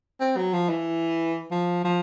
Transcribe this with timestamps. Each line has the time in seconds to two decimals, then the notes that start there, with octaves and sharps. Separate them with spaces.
0.20 C4
0.37 F#3
0.53 F3
0.69 E3
1.51 F3
1.84 F3